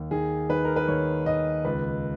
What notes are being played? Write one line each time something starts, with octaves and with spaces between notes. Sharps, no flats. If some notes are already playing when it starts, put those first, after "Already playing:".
Already playing: D#2
D#3 G#4
D#3 B4
A#4
B4
D#2 C#5
D#2 D#5
C#2 B4